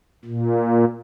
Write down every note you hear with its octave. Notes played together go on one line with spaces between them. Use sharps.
A#2